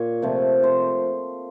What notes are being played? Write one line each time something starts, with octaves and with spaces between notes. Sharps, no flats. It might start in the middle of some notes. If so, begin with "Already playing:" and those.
Already playing: A#2 C#5
C3 F3 A3
C5